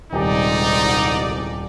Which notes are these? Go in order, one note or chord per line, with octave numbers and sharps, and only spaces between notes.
D#1 C2 G#2 D#4 G4 D5